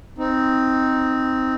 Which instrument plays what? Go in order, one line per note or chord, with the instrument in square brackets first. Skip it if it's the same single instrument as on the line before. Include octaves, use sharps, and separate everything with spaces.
[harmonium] C4 D#4